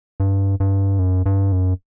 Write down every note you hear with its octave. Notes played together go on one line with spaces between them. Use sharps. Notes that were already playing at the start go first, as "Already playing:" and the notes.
G2
G2
F#2
G2
F#2